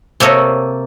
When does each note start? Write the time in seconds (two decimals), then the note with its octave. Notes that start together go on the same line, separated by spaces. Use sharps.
0.20 C3 A#3 A4 C#5 D#5